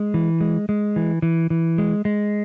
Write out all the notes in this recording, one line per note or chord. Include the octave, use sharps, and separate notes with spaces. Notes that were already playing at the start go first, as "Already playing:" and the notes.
Already playing: G#3
E3
G#3
G#3
E3
E3
E3
G#3
G#3